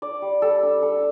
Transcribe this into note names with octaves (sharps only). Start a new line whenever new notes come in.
D4 D5
G3
G3 A4
D4
D4 A4